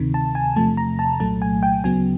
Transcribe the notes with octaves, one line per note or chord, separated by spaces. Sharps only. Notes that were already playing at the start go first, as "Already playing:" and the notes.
Already playing: D2 C3 D#3
A5
G#5
E2 C3 F3 A3 A5
A#5
A5
C2 A#2 F#3 A3 A5
G#5
G5
D2 C#3 F#3 B3 G#5